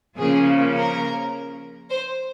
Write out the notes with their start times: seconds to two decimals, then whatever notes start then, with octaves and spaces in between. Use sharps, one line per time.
0.17 C#3 F3 A#3 C#4 G#4
0.75 A#4
1.90 C5